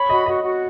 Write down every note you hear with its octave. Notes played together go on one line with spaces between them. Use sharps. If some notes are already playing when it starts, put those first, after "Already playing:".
Already playing: C#5 B5
F#4 D#5
F#4 D#5
F#4